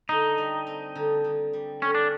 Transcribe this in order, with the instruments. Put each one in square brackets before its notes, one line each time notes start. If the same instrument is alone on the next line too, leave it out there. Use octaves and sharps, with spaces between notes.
[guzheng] D3 [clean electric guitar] D#4
[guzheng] G3
C4
D3
D3
G3
[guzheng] D3 [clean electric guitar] C#4
[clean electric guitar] D4